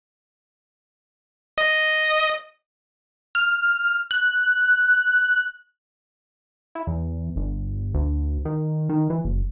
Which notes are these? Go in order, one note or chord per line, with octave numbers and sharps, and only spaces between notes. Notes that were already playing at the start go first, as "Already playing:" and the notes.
D#5
F6
F#6
E4
E2
G1
D2
D#3
D#3
E3
F#1